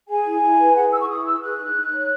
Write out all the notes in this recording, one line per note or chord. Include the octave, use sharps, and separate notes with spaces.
G#4 G#5
E4
E4
B4
G#4 F#5
E4 E6
C#6
E4 D#6
B4 E6
G#4 F#6
D#4
D#4
C#5